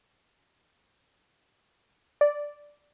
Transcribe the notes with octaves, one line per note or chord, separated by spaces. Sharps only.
D5